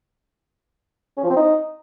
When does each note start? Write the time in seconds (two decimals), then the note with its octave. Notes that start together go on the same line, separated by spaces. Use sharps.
1.17 C#4
1.24 F3
1.30 C4
1.37 D#4